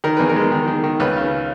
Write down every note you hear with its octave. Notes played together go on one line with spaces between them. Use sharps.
D#3 A#4
E2 B4
A#4
G#3
D#3
D#3
D#3
C#2 B4
C#3